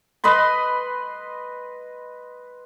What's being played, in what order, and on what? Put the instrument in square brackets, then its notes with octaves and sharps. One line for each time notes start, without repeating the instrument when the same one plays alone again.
[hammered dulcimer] B4 D#5 B5 C6